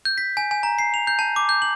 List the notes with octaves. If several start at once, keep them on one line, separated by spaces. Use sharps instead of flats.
G6
B6
G#5
G#5
A#5
C7
F7
G6
A5
D6
G6
F#7